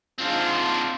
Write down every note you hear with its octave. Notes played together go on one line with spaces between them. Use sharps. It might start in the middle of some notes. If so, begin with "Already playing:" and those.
G#2 C4 D4 F4